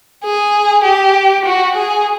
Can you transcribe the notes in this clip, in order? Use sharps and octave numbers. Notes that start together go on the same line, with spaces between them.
G#4
G4
F#4
G#4